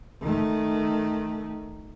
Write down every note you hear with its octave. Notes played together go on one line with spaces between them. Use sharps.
D#3 A3